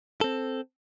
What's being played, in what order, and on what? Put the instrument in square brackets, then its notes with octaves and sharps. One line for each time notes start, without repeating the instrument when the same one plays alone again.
[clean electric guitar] C4 A4